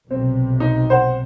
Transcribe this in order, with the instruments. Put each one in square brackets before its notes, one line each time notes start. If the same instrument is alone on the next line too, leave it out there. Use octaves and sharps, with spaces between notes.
[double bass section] B1 C3 [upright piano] C4
[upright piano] D#4
C5 F#5